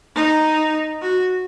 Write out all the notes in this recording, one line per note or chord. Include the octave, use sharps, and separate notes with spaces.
D#4
F#4